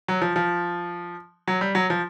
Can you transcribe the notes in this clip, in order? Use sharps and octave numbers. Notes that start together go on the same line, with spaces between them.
F#3
F3
F3
F#3
G3
F#3
F3